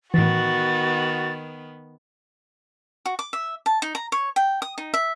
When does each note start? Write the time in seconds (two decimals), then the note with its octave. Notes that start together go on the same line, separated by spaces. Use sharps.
0.14 A2 D#3 E3 B3 F#4 A6
3.06 F#4
3.19 D6
3.33 E5
3.66 A5
3.82 D#4
3.95 A#5
4.12 C#5
4.36 G5
4.62 D#6
4.78 D#4
4.94 E5